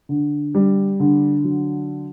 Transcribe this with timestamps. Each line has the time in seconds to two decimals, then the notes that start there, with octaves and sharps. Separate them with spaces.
0.09 D3
0.55 G3
1.00 D3
1.44 F#3